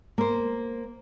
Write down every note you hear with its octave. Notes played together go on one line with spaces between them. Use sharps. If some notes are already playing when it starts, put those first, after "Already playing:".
A#3 C5